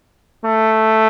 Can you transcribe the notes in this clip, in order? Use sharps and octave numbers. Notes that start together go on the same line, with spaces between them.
A3